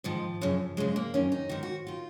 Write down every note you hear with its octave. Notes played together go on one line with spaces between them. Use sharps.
G#2 D#3 F3
F#2 C#3
F#2 C#3 G#3
A#3
F#2 D#3 C#4
D#4
G#2 D#3 F#4
F#4
D#3 F4